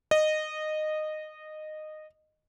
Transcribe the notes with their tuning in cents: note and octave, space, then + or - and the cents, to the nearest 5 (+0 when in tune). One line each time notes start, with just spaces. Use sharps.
D#5 -15